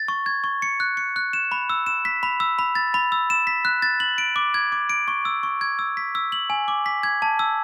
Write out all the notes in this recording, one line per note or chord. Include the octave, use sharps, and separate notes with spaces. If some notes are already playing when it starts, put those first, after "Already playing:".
Already playing: A6
C#6
G#6
C#6
C#7
F#6
C#7
F#6
E7
B5
E6
E7
B6
B5
E6
B5
A6
B5
E6
E7
B6
F#6
A6
F#7
D7
D6
G#6
D6
D7
C#6
E6
C#6
G#6
E6
B6
E6
F#7
G#5
D6
B6
G#6
A5
E6